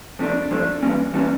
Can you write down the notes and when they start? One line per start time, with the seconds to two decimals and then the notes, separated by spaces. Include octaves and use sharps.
0.19 F2 C3 F3 A3 D4
0.51 F2 C3 F3 A3 D4
0.83 E3 G3 A#3 C#4
1.14 E3 G3 A#3 C#4